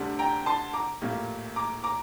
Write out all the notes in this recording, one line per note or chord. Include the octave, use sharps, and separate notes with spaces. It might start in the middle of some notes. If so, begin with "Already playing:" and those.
Already playing: D2 C3 G3 D4
G5 A#5
A5 C6
A#5 D6
A#1 A2 G3 A#3
A#5 D6
A#5 D6